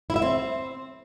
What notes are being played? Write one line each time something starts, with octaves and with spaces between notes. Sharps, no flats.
E4
E5
C4